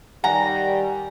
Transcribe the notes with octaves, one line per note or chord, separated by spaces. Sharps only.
D#3 G3 F#5 G#5 A#5 A#6